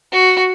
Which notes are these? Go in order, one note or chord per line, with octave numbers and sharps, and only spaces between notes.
F#4